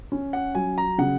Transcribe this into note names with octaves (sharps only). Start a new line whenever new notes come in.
C#4
F#5
F#3 G#5
A#5
C#3 F#5